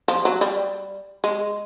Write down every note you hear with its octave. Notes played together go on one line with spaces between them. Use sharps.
F3
F#3
G3
G#3